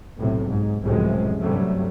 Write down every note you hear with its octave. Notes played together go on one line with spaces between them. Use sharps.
B1 A2 C3
G#2
C#2 F#2 A2 C3 F3 G#3
G2 C3 F#3 G3 A3